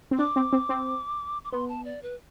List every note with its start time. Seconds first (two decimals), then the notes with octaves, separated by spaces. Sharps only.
0.11 C4
0.18 D4 D6
0.36 C4
0.53 C4
0.69 C4
1.44 D6
1.52 B3 C6
1.69 A5
1.85 D5
2.03 B4